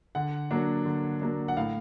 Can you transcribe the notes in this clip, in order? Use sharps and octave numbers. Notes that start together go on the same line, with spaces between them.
D3 F#5
F#3 A#3 D4
D3
F#3 A#3 D4
F#5
A2 F5